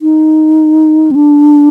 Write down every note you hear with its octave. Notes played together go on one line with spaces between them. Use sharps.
D#4
C4
D4